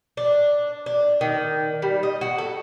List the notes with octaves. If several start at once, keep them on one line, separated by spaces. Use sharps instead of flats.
D4
D4
D#3
G3
D#5
F#4
A4